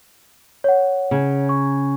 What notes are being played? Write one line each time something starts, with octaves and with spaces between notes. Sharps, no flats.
C#5 F#5
C#3
C#6